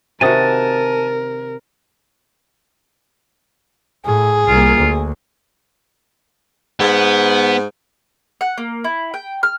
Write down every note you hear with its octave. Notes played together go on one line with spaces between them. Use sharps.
C3 D#3 F#4 A#4 G#5 A5 D#6
A2 G#4
C2 A#3 F4
D2
G#2 B3
F#5
A#3
E4
G5
F6